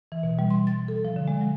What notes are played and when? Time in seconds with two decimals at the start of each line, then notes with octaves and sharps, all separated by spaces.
0.12 E3
0.23 B2
0.39 G3
0.50 C6
0.67 A6
0.88 A4
1.05 F3
1.16 D3
1.28 G#3
1.41 F#3